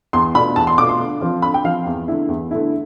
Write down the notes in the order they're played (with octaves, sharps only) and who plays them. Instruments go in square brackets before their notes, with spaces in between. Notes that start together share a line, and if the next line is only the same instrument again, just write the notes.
[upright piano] E2 C6
B2 A3 D4 F4 B5
E2 A5
C6
B2 A3 D4 F4 D6
C6
D3
F3 C4 F4
D3 B5
G5
F3 C4 F4 F5
E2
D3 A3 E4
E2
D3 A3 E4